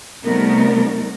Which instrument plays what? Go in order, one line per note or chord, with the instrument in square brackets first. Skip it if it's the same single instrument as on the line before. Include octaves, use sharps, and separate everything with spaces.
[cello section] C3 G3 A3 B3 D#4 A#4